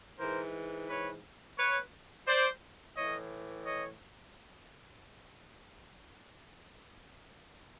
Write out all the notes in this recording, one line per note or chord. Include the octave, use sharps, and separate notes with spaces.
G#2 E3 A#4 C5
B4 C#5
B4 C#5
C5 D5
A2 E3 C#5 D#5
C#5 D#5